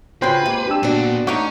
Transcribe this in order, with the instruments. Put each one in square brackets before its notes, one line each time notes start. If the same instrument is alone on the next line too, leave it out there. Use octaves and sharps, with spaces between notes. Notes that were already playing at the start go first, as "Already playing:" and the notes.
[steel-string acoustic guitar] C#3 F#4 [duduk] F4 [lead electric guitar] B4 [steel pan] C5 G5 C6
[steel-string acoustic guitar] C3 G#3 [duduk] A#3
[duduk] D4 [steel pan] G4 E6
[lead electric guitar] A#2 [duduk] B3 [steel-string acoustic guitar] D4 F#4
[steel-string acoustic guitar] A3 D#4 A#5 [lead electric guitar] C#4 [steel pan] F#5 C#6 D6